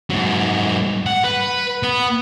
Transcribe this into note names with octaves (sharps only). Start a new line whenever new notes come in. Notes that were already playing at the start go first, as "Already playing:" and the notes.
G#2 F#3
F#5
B4
B3